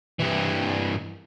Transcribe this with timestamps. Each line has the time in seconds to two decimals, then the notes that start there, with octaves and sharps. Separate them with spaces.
0.20 G2 E3